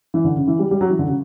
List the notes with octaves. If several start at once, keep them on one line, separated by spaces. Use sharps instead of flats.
E3
D3
C#3
E3
G3
G3
F#3
E3
D3
C#3